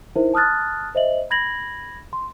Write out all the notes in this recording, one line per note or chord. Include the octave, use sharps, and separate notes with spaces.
D#4 E4 A#4 C5 E5
A5 D#6 F6 F#6 A6
C5 D#5 E5 F#7
B5 G#6 A#6 F#7
C6